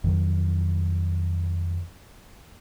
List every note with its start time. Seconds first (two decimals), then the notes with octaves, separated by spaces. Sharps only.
0.04 F2 D#3 F#3